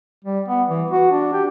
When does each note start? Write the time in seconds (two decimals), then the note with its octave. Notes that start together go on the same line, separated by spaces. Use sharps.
0.24 G3
0.48 B3
0.68 E3
0.91 F#4
1.11 D4
1.33 G4